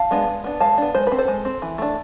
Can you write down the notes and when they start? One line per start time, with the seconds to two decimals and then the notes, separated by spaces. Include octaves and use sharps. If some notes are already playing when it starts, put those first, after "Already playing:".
Already playing: F5 A5
0.11 G#3 B3 D4
0.28 G#3
0.44 B3 D4
0.60 G#3 F5 A5
0.78 B3 D4
0.95 G#3 C5
1.07 C4 B4
1.18 A4 C5
1.28 G#3
1.45 C4
1.62 E3
1.78 A3 D4